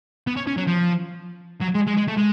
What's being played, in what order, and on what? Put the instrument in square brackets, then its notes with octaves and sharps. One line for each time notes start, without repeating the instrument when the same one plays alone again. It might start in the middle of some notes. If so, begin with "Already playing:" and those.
[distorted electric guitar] B3
C#4
C#4
F#3
F3
F#3
G#3
G#3
G#3
A3
G#3